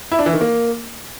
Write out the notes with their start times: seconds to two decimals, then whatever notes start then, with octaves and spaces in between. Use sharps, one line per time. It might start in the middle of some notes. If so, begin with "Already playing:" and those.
0.12 E4
0.19 D4
0.26 E3
0.33 D#3
0.41 A#3